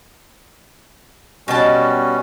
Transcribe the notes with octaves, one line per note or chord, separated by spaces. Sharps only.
B2 G3 C#4 F#4 G5 A5